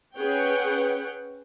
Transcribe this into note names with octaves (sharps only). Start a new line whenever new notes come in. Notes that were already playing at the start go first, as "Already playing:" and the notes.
C#4 G#4 B4 C#5 F#5 G5